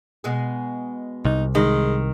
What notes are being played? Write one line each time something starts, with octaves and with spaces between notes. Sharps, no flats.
B2 G#3 G#4
C2 D#4
D#3 G#3